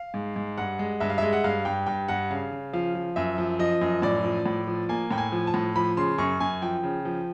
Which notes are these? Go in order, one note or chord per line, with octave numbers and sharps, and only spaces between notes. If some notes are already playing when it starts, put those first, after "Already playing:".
Already playing: F5
G#2
G#2
G2 F#5
G#3
G2 E5
F5
G#3 E5
F#5
G2 F5
G2 G5
G2 G5
G2 F#5
C#3 F5
C#3
F3 F5
F3
F#2 E5
F3
F3 D#5
F#2
A2 D5
F3
A2
F3
A#3 G#5
A2 G5
G#5
F3
A5
A2
F3 B5
C#3 C6
F#2 C#6
F#2 G#5
F3 G5
C#3
F3